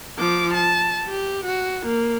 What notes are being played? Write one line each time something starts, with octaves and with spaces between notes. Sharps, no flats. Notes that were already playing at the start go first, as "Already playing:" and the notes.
F3 D6
A5
G4
F#4
A#3